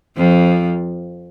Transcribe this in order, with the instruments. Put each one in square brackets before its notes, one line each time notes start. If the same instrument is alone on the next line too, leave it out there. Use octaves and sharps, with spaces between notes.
[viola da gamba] F2 F3